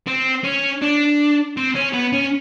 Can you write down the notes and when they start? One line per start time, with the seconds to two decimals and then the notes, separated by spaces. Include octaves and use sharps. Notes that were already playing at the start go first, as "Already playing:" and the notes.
0.07 C4
0.44 C#4
0.82 D4
1.57 C4
1.75 C#4
1.93 B3
2.13 C#4